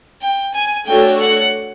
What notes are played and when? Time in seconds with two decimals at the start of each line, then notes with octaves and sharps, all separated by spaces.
0.22 G5
0.54 G#5
0.86 A3 D4 F#4 A4 C#5 G5
1.20 F#5